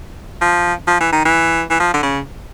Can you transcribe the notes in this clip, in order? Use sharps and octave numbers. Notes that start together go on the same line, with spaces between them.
F3
F3
E3
D#3
E3
E3
F3
D3
C#3